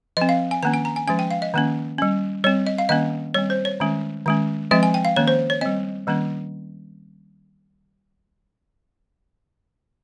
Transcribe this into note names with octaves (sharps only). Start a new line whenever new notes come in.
F3 C4 D#5
F5
G#5
D#3 A#3 C#4 A#5
G#5
A#5
G#5
F3 G#3 C#4 G#5
G5
F5
D#5
D#3 A#3 C#4
G3 C#4
G3 C4 C#5
D#5
F5
D#3 A#3 C#4 D#5
G3 C4 C#5
C5
C#5
D#3 G#3 C#4
D#3 G#3 C#4
F3 G#3 C4 D#5
G#5
G5
F5
D#3 A#3 C#4 C#5
C5
C#5
G3 C4 D#5
D#3 G3 A#3 C#4